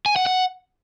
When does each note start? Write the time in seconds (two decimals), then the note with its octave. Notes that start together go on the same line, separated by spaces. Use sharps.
0.06 G#5
0.16 F#5
0.26 F#5